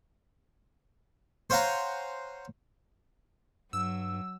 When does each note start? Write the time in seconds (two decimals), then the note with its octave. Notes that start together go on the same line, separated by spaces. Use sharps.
1.50 C5 C#5 F5 F#5 G#5 A#5
3.73 G2 F#3 E6